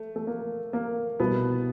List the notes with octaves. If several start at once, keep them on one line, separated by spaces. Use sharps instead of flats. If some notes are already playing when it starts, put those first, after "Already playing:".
Already playing: A3
A3
A#3
A#3
C2 B2 B3